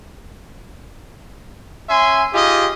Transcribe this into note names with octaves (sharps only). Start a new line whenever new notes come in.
C#4 E5 G#5 C6
D#4 F4 G4 G#4 D#5